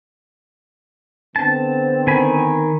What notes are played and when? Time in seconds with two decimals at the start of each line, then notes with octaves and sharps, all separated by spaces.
1.36 D3 B3 C4 A5
2.07 D#3 G#5 B5